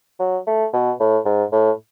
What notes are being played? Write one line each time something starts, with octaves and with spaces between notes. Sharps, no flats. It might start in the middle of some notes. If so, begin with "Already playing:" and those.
F#3
A3
B2
A2
G#2
A2